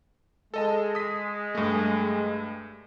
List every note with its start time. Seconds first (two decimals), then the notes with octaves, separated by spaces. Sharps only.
0.54 G#3 A4 D#5 A5
0.95 D#6 B6
1.55 G2 A3